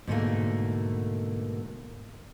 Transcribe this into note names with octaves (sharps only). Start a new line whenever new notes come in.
G#2 B2 D3 D#3 A3 A#3